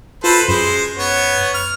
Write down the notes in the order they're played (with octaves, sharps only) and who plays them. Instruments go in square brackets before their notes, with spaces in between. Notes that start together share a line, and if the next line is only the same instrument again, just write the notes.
[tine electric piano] F4 [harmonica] A4 B4 C5
[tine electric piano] F#2 [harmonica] G#3 C5
[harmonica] B3 C#5
F6